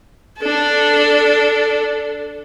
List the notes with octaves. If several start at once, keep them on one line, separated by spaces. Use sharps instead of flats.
D4 A4